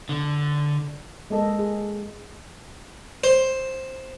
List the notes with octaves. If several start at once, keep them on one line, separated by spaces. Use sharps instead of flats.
D3
G#3 A#3 A4 D#5
G#4
C5